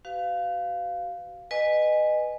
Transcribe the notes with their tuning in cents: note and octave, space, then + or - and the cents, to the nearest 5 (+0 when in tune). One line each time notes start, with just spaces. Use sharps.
F#4 +40 B4 +25 F5 +0
B4 +0 D#5 -20 G#5 +0